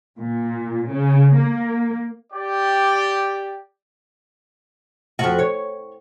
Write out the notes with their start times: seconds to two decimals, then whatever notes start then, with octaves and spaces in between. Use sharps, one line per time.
0.19 A#2
0.89 C#3
1.36 A#3
2.33 G4 D5
5.19 F2 F#4
5.39 C#5